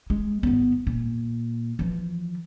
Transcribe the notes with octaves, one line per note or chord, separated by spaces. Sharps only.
G#3
G#1 B3
A#2
E3 F3